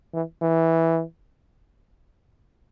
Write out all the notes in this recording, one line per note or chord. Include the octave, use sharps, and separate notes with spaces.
E3
E3